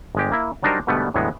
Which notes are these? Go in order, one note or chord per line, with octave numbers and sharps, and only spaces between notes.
G1 G#3 G4
A#3 E4
F#3 G3 D4 D#4 A#4 C5
G#2 B2 D3 G3 A3 B3
E2 A2 D3 F#3 G#3 B3